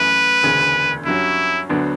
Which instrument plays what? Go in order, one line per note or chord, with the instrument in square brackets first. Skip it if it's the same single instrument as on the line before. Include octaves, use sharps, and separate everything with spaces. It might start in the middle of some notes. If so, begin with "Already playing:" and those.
Already playing: [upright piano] F#2 E3 A3 [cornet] B4
[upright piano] E1 D2 C#3
[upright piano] G2 F#3 C#4 [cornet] E4
[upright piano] D2 D3 F#3 B3 D4